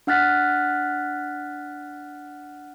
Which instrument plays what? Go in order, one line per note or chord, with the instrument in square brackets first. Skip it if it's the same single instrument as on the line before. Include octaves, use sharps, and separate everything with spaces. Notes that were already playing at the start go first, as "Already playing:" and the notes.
[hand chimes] D4 F#5 F6 F#6 A6 B6